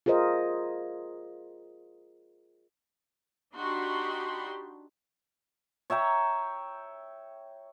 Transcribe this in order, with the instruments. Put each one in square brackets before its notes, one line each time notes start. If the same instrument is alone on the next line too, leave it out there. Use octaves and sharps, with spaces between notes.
[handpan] F4 G#4 A#4 C5 D#5
[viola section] D4 D#4 F#4 G4 B5 C6
[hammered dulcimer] C#5 E5 G5 A#5